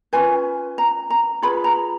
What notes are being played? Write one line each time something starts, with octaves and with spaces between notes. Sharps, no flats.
C#4 F4 B4 G#5
A#5
A#5
F4 G#4 B4 B5
A#5